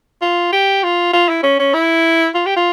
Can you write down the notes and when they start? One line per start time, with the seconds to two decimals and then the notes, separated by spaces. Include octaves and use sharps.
0.22 F4
0.53 G4
0.83 F4
1.13 F4
1.29 E4
1.44 C#4
1.60 C#4
1.74 E4
2.35 F4
2.46 G4
2.57 F4